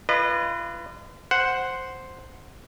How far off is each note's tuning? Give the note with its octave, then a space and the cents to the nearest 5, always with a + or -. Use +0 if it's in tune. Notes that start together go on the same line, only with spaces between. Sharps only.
F4 -35 B4 +0 D#5 -40
C5 +0 F#5 +0